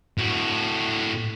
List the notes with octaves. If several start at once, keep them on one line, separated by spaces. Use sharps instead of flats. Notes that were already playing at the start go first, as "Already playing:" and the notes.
A2 F#4